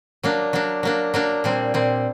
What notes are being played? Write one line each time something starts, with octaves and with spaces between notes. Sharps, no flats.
F#3 A#3 D4
F#3 A#3 D4
F#3 A#3 D4
F#3 A#3 D4
A#2 G3 C4
A#2 G3 C4